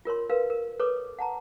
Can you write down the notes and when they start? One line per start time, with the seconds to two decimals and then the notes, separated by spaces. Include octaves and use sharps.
0.05 F4 A#4 C#5 C6
0.29 A#4 B4 F5
0.50 A#4
0.80 A4 B4 C#5 D6
1.19 F#5 A5 A#5